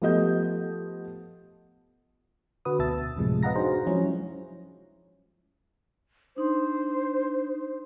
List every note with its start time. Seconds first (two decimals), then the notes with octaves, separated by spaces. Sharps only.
0.02 F3 A3 B3 G4 D#5 G6
2.65 D3 F#4 B4 D#6
2.79 D2 B2 E5 A5 E6 A6
3.17 F#2 A2 C3 F3 G#3
3.43 B4 D#5 F5 F#5 A#5 A#6
3.55 D4 D#4 F#4 G#4 C5 A#5
3.86 F3 F#3 G#3 C#4 E4
6.36 D4 D#4 C5 C6